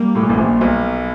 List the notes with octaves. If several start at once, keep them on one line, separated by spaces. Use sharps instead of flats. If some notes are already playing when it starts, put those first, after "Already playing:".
Already playing: G3 A#3
A2
A#2
A1 A2
A#1 A#2
B1 B2